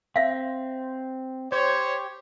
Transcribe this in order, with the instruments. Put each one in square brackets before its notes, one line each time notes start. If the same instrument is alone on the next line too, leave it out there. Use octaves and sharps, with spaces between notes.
[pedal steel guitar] C4 [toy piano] E5 F5
[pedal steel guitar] G4 [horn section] C5 C#5